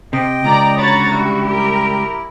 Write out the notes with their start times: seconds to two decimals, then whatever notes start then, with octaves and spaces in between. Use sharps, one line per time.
0.13 C3 D#5 G5
0.45 C#2 D5 A#5
0.77 D3 F#4 C#5 A#5 B5 A6
1.11 G3 E4
1.46 G4 A#4